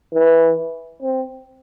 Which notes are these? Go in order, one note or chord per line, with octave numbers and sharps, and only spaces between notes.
E3
C4